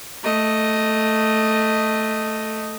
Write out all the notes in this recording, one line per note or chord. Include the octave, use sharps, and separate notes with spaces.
A3 D#5